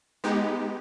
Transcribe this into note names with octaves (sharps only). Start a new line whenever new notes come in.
G#3 B3 D#4 G4